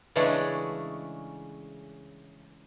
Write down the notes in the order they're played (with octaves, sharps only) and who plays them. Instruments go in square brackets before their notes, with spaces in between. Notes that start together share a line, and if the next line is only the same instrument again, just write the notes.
[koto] C#3 E3 G#3 A3 C#4 D4